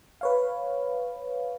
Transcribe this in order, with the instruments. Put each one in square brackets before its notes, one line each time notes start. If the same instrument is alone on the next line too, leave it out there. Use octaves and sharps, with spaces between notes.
[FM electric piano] B4 C#5 F5